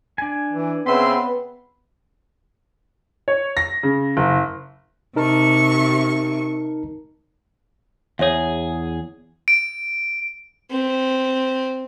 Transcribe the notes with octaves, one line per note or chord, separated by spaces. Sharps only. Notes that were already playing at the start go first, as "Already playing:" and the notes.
D4 G#5
E3
C#3 B3 C4 B4 E5 C6
C#5
A#6
C#3
F#1
C3 D#4 A#4 A5 C#6
E2 G#4 C#5 E5
D7
C4